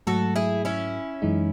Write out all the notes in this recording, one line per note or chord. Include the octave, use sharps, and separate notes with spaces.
G#2 F#3 A3 F#4 A4
E4 G#4
C#4 E4
F#2 E3 G#3 D#4